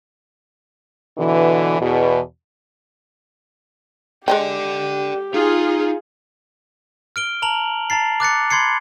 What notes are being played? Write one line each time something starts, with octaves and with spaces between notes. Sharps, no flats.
B2 D3 E3
E2 B2
G#3 G4 A4 D5 D#5 G5
D#4 F4 G#4
F6 D7 G7
A5 A#5 F7 F#7
A5 A#5 A6 C7
D6 F#6 A6 C#7
B5 C6 G#6 C7 C#7